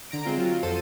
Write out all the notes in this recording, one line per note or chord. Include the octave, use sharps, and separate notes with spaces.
D3 A#5 D7
G#3 C4 F4
F#3 F4
F2 A4 C5 E6 D#7